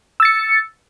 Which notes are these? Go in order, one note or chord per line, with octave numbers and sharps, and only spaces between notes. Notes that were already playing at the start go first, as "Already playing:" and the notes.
E6 A6 C#7